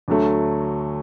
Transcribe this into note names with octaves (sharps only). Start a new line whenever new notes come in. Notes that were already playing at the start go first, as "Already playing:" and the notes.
D2 D3 F#3 A3